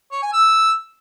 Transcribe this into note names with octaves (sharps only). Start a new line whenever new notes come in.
C#5
G#5
E6